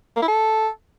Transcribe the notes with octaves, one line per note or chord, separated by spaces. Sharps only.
A#3
E4
A4